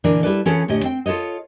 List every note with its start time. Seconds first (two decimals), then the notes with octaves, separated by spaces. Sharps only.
0.04 A#2 D3 E3 D4 A#4 D5
0.23 G3 E4 G#4 A4 B4 D5
0.45 E3 C#4 F4 G#4 A4 B4
0.68 D2 A2 C#4 G4 D#5
0.84 C4 G5
1.06 F4 A4 B4 C#5 D#5